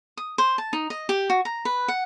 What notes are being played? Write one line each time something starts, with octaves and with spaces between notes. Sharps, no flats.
D#6
C5
A5
D#4
D#5
G4
F#4
A#5
B4
F#5